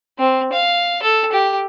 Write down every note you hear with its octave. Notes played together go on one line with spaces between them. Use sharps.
C4
F5
A4
G4